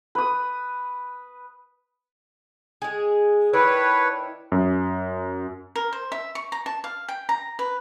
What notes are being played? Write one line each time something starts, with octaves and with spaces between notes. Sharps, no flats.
B4 D#6
G#3 G#4
D#3 D4 E4 B4 C#5
F#2
A#4
C5
E5
C#6
A#5
A5
F5
G5
A#5
B4